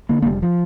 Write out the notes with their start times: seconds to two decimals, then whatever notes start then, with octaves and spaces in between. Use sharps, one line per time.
0.09 D3 A#3
0.22 A#3
0.26 F1 G3
0.42 F3